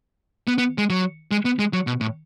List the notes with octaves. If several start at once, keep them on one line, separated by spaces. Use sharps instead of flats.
B3
B3
G#3
F#3
G#3
B3
G#3
F#3
B2
A2